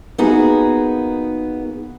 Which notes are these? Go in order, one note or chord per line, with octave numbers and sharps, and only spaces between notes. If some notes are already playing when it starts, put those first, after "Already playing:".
A#3 B3 D#4 F#4 G#4